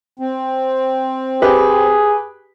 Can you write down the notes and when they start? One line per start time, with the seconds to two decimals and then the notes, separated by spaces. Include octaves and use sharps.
0.19 C4
1.42 G4 G#4 B4